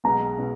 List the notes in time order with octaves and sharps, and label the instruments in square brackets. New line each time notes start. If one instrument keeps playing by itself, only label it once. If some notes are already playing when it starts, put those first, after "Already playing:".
[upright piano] B1 B2 G#3 B3 [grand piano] A#5
[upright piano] B2 G#3